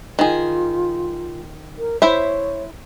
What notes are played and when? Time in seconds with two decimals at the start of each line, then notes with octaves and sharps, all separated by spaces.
0.19 D#3 F4 G#4
1.78 A#4
2.02 E4 C5 C#5 E5